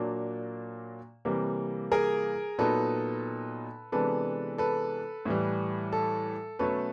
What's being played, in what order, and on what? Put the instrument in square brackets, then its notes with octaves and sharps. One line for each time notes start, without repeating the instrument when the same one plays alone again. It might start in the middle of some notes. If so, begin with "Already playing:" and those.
Already playing: [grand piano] A#2 F#3 A#3 D4
C3 E3 G3 A#3
G#4 A#4
A#2 F#3 B3 D#4 A4 B4
C3 E3 G#3 B3 D4 A4 B4
A4 B4
A2 E3 G3
A4
B2 F#3 A3 C#4 A4 B4